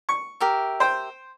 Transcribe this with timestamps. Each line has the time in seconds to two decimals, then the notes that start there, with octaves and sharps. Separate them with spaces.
0.09 C#6
0.40 G4 A#4 E5
0.80 C5 G5